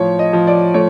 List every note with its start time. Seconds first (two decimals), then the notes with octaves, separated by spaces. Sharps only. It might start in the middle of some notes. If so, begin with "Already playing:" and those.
Already playing: A2 F3 C#5
0.19 D#5
0.33 F3
0.47 D5
0.74 A3 C#5